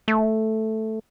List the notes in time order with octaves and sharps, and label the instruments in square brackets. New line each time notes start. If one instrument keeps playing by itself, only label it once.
[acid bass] A3